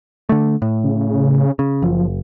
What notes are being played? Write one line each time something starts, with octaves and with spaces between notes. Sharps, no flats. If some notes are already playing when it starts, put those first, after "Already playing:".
D3 A3
A2
C#3
C#3
F#1 F3